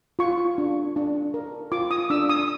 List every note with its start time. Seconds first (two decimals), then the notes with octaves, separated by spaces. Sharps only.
0.19 F4 C#6
0.58 D4
0.96 D4
1.34 A#4
1.72 F4 D6
1.91 D#6
2.10 D4 E6
2.29 D#6